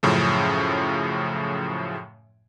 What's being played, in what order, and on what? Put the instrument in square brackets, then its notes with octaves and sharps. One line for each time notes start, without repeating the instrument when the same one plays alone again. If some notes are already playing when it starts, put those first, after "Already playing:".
[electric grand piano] F#2 A2 C#3 F3